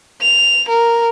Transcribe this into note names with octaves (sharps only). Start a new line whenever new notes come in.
F7
A#4